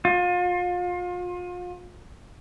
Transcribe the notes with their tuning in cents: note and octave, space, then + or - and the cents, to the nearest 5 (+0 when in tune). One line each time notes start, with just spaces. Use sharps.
F4 +35